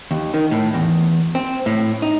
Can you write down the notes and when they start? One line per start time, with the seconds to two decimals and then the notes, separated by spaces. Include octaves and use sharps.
0.11 D#2
0.34 D#3
0.51 A2
0.74 E2
1.35 C4
1.66 A2
2.02 D#4